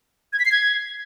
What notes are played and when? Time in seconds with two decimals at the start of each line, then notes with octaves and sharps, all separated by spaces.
0.33 G#6
0.39 B6
0.45 C7
0.52 G#6